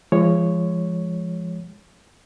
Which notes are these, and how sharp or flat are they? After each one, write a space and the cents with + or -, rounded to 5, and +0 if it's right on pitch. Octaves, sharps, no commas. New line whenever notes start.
F3 -35 G#3 -15 C#5 +0